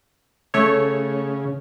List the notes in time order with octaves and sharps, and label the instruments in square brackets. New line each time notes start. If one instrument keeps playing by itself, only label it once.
[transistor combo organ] C#3 [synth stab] A3 C#5